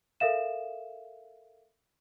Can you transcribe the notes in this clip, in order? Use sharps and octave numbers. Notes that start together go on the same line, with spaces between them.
A4 A#4 E5 F5 E7